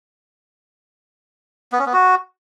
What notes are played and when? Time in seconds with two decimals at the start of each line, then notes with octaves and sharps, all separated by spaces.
1.72 B3
1.79 C#4
1.86 B3
1.93 F#4